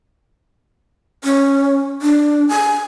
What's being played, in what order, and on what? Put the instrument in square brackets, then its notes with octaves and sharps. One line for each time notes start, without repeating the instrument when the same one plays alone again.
[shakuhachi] C#4
D4
G#5